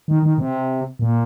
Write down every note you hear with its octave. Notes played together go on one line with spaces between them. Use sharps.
D#3
D#3
C3
A#2